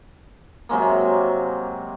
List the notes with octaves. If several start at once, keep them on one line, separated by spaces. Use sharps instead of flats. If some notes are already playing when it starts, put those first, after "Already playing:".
C3 F#3 G#3 A#3